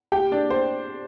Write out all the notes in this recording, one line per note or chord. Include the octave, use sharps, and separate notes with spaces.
G4 G5
D4 D5
C5